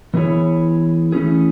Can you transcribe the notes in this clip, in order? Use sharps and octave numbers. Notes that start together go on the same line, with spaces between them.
E3 B3 E4 G#4 C#5
E3 A3 C#4 E4 G#4